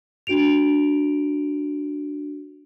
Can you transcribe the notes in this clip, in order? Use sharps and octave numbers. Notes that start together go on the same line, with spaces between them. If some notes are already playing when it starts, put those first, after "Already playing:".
D4 F#4 D7 F7